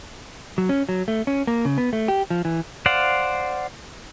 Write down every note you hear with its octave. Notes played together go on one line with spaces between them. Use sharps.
F#3
C#4
F#3
A3
C#4
A#3
C#3
B3
A3
G4
F3
E3
C5 D5 F5 F#5